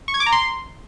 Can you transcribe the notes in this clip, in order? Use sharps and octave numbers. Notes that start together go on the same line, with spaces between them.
C#6
G#6
D6
A#5
C6